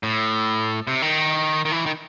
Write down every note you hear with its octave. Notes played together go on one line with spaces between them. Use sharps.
A2
C3
D#3
D#3
E3
D#3